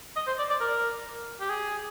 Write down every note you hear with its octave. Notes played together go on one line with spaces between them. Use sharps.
D#5
C5
D5
D5
A#4
G4
G#4